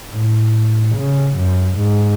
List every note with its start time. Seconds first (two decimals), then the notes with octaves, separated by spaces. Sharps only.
0.13 A2
0.95 C#3
1.37 F#2
1.78 G#2